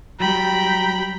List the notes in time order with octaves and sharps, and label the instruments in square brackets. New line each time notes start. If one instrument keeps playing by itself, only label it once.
[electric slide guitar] F#3 G3 [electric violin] G5 B5 [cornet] A#5